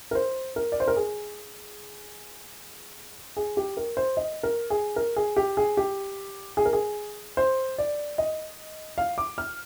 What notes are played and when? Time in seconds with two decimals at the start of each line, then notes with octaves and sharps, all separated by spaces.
0.11 A#4
0.15 C5
0.56 A#4
0.72 D5
0.80 C5
0.88 A#4
0.96 G#4
3.37 G#4
3.57 G4
3.77 A#4
3.97 C5
4.17 D#5
4.43 A#4
4.70 G#4
4.96 A#4
5.16 G#4
5.36 G4
5.57 G#4
5.77 G4
6.57 G#4
6.65 A#4
6.73 G#4
7.37 C5
7.78 D5
8.18 D#5
8.98 F5
9.18 D6
9.38 F6